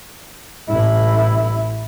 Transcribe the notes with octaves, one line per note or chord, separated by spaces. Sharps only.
A1 E4